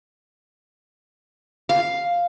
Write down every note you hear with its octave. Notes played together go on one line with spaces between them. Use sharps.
F5